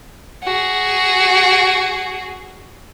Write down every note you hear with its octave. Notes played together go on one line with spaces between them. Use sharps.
F#4 G#4